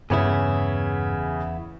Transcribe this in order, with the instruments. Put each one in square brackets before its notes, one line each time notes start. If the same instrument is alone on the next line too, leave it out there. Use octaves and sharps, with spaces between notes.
[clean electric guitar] E2 B3 E4 [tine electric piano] G2 [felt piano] C#3 G#4